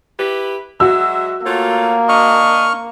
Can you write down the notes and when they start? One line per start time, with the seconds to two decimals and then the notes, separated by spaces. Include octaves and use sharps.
0.19 E4 G4 B4
0.80 F#3 G#3 F#4 E5 E6
1.46 A3 A#3 F4 C#5
2.09 D4 D#5 C#6 F6